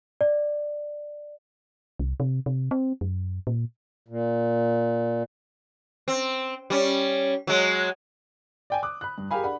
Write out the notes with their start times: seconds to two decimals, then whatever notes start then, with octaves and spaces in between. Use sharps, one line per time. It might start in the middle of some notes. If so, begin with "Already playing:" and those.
0.21 D5
2.00 C2
2.20 C3
2.46 C3
2.71 C4
3.01 F#2
3.47 A#2
4.08 A#2
6.08 C4
6.70 G3 C#4
7.47 F#3 G#3
8.70 D5 G5 G#5
8.83 D6 D#6 F#6
9.01 B5 F#6
9.18 G2
9.31 G4 G#4 A#4 F5 G#5 B5
9.44 D4 F#5 B5